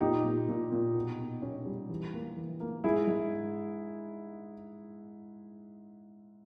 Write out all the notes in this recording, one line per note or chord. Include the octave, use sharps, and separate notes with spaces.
A#2 D#4 G4
A#2
A#2
A#2
B2
B2
C#4
G3
E3
A#3
E3
A#3
G#2 E4 G#4
G#2